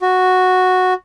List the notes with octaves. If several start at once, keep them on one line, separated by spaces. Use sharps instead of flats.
F#4